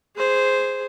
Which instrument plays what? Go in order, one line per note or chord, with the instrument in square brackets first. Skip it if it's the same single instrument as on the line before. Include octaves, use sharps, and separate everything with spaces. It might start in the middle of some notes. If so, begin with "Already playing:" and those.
[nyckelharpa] G#4 C5